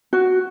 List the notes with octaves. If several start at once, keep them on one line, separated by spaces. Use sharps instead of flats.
F#4